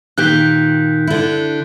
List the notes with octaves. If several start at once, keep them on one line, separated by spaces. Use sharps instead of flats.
A#2 D#3 G4 F#6 G6 B6
D3 E4